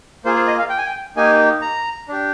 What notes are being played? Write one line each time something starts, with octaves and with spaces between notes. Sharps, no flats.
A#3 F4 G#4 C5
C5
D#5
F5
G5
G#5
G5
A#3 D#4 G4 G#5
A#5
D4 G4